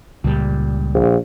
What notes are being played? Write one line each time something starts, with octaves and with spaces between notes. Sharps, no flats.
C#2 A#2 G3
A#1